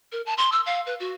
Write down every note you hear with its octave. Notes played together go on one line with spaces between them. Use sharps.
A#4
A5
C6
E6
F5
B4
F#4